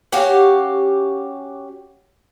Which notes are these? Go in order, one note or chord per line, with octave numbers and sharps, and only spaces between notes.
C#4 F#4 G4 F5